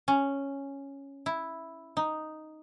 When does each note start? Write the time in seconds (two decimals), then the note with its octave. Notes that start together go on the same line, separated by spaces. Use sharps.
0.08 C#4
1.26 E4
1.97 D#4